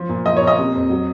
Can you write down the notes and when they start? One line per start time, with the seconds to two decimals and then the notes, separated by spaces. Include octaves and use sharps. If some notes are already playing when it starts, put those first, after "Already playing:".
Already playing: F3
0.09 A#2
0.26 F3 D#5
0.37 C#5
0.42 A#2
0.47 D#5
0.59 C3
0.74 F2
0.90 F#3